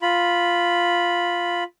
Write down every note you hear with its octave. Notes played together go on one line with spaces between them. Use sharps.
F4 B5